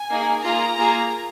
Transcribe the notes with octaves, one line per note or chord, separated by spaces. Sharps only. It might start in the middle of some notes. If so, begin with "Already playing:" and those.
Already playing: G#5
A#3 D#4 G#4
A#3 F4 G#4 A#5
A#3 F4 G#4